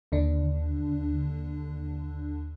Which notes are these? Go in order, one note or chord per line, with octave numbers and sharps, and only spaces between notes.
D#2 D3 D4